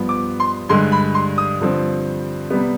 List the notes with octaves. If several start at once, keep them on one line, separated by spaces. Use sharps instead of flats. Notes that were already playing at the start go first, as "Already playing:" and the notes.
Already playing: G2 F3 B3
D6
C6
G2 D3 G#3 C6
B5
C6
D#6
G2 D3 F3 C4
C3 G3 B3